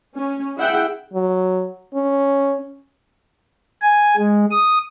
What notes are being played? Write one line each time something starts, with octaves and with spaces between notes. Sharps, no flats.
C#4
E4 G#4 E5 F#5 G5
F#3
C#4
G#5
G#3
D#6